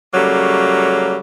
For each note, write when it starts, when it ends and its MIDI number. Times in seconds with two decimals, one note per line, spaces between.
0.14 1.17 49
0.14 1.17 54
0.14 1.17 55
0.14 1.17 57
0.14 1.17 58